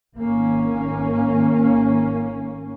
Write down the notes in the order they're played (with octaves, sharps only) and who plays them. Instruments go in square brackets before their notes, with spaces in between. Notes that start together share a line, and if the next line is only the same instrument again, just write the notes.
[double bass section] G#1 A#3 C#4